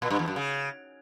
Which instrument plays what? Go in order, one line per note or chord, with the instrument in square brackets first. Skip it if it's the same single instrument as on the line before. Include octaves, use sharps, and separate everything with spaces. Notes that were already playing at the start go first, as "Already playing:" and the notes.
[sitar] A#2
G2
E2
F#2
C#3